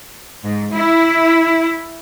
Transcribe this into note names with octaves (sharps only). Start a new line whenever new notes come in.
G#2
E4